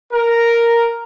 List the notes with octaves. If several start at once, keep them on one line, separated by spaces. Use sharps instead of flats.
A#4